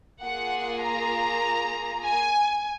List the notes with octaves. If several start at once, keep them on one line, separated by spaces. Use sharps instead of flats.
A#3 F4 G#4 F#5
A#5
G#5